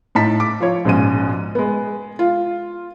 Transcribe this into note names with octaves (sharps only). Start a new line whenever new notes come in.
A2 D#4 A5 B6
D6
F3 C#5
A#1 G#2 B2 C#4 D#7
G#3 B3
F4